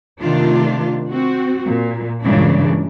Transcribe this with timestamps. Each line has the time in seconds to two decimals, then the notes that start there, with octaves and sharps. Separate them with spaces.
0.21 C3 D#3 A3 D4 F4
1.11 C4 F#4
1.66 A#2
2.22 G2 A#2 C#3 E3 G#3 D4